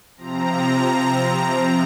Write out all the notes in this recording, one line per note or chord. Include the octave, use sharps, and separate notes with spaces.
C3 F3 C4 A#5